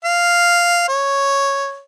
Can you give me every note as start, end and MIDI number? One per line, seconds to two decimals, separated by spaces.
0.05 0.84 77
0.88 1.80 73